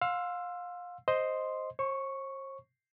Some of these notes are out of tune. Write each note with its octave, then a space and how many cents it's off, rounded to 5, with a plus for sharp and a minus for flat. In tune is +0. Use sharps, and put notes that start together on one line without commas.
F5 +30 C6 +0 E6 +20
C5 +0 D#5 +0 C6 +0
C5 +45 C#6 +0